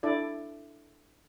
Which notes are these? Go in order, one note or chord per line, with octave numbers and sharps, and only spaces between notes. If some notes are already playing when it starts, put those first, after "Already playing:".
D4 E4 A4 D5